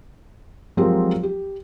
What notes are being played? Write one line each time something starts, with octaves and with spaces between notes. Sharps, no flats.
F3 F#3 G#3 C4 G4 A#4
G4